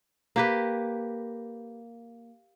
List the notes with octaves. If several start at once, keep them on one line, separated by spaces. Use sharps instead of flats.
A#3 G4 B4